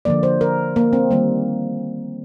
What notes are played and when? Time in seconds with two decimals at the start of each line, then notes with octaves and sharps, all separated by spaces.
0.05 D3 F3 A#3 D5
0.23 C5
0.41 A#4
0.76 A#3
0.93 C4
1.11 D#3 G3 A#3